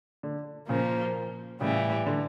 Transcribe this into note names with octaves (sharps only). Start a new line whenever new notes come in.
D3
A#2 C#3 F3 A#3
A2 C#3 E3 G3
D3